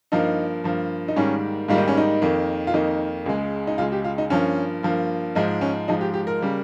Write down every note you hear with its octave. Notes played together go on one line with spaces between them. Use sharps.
G2 F3 A#3 D#4
G2 F3 A#3
D#4
G#2 D#3 G3 A#3 C#4
G#2 D#3 G3 A#3 F4
D#4
C#4
D#4
F2 D#3 A#3
F4
F2 D#3 A#3 D#4
C#2 C#3 G#3
D#4
C#2 C#3 G#3 F4
G4
F4
D#4
G2 F3 A#3 C#4
G2 F3 A#3
G#2 F3 G#3 D#4
C#4
G#2 F3 G#3 D#4
G4
G4
A#4
C#3 G3 A#3